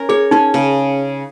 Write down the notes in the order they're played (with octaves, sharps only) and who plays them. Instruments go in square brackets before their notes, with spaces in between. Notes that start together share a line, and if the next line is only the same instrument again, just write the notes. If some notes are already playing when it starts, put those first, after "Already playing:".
Already playing: [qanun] C#4 A#4
[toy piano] G#4 [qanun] C#5
[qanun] C#4 [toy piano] D#4
[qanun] C#3